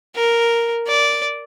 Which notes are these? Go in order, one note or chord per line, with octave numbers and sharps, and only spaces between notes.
A#4
D5